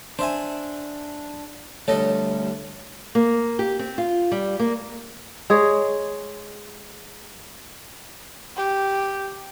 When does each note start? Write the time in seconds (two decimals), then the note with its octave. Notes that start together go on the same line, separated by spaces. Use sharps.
0.19 D4 C5 E5 G#5
1.88 D3 G3 A3 A4 C#5 D#5
3.15 A#3
3.59 G4
3.79 C4
3.98 F4
4.32 G3
4.59 A#3
5.50 G#3 G#4 C#5
8.56 G4